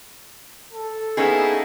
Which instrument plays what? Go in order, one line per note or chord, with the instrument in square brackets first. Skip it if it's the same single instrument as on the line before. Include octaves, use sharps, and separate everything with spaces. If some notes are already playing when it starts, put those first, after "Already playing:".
[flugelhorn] A4
[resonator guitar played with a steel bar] A#3 C#4 G#4 [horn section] B3 D#4 E4